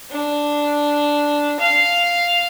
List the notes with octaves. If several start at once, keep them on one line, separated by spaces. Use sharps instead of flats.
D4
F5